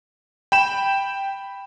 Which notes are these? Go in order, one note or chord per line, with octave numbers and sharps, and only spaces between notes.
G5 B5 E7